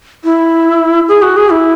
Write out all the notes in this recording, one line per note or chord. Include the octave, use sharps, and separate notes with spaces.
E4
G#4
F#4
G#4
E4